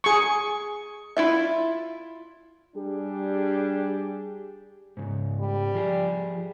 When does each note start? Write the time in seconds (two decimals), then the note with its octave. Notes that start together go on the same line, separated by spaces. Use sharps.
0.04 G#4 C#6
1.17 E4 F4 E5
2.76 G3 D4 G4 G#4
4.97 G#2 C#3
5.40 G3
5.75 F3 G#4